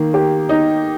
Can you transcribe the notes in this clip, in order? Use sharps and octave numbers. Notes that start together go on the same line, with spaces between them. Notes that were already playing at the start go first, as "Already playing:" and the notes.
Already playing: D#3 A#3
G4
D#4